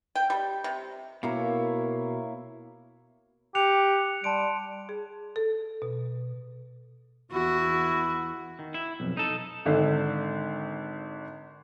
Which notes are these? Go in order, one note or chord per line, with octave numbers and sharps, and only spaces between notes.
G5
G3
C3
B2 A#3 E4 C#5
G4 F#6 C#7 F7
G3 A5 C6 D7
G#4
A4
B2
E2 E4 F#4
D#3
E4
B1 F2
D#4 A4
G#1 D3